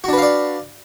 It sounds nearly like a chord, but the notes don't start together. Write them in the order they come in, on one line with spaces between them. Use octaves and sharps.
F#4 D4 B4 F5 D5